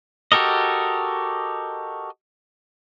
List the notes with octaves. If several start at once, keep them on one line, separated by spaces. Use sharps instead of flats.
F#4 G4 A4 A#4 D#5